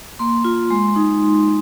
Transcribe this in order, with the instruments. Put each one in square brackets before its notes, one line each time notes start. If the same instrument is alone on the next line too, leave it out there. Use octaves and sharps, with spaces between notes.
[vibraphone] A#3 C6
F4
G#3 C6
D#4